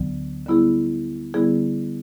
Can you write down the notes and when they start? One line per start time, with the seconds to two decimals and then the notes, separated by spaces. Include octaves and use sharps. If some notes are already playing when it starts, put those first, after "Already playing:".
Already playing: D2 D3 F#3 B3
0.46 D3 G3 B3 E4 G#4
1.34 D3 G3 B3 E4 G#4